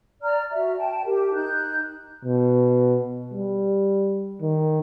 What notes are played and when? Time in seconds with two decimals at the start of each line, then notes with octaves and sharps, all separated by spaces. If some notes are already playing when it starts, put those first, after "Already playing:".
0.23 D5 A#5 F6
0.53 F#4 E5
0.78 G5 A5
1.05 G4 A#4
1.34 D#4 F#6 G6
2.25 B2
3.34 G3
4.42 D#3